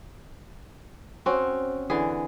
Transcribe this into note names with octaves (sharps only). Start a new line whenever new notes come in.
C4 C#4 F#4
D3 E3 G#4